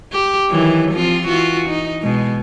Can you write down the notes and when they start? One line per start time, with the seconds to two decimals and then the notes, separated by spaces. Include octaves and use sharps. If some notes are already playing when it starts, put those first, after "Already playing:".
0.12 G4
0.50 D#3 E3 F#3
0.91 F3 C4 F4
1.28 E3 F4 F#4
1.69 D#4
2.02 B2 G#3